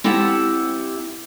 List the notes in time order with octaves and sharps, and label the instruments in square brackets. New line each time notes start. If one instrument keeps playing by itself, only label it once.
[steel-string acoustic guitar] C4 E4 G4 E5 F#5 A5